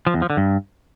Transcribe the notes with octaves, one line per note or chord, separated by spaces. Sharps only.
F3
E2
F3
D3
G2